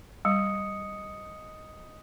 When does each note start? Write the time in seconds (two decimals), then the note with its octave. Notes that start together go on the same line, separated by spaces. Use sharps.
0.25 G3 D#5 D#6 C#7